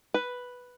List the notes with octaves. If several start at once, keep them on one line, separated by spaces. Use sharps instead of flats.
B4